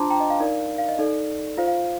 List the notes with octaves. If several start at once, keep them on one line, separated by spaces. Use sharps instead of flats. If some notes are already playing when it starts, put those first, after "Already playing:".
Already playing: D4 F4 C5 A5 A#5 C6 D6
G5 A#5
D#5
F5
D#4 A#4 D5
F5
D#5
D#4 A4 D5
F4 C5 F5
F5